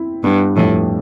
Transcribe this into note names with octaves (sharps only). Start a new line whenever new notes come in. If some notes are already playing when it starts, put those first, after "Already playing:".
Already playing: C4 E4
G2 B3
F2 A2